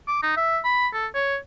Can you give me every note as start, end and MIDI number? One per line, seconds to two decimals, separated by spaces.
0.08 0.22 86
0.22 0.34 63
0.37 0.59 76
0.64 0.88 83
0.93 1.07 69
1.15 1.36 73